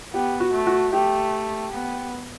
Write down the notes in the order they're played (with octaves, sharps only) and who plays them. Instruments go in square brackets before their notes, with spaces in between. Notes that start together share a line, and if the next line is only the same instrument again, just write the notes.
[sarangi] B3 [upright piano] G4
[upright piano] F#4
[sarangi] A3
[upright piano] F#4
[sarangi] A3 [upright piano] G4
[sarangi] B3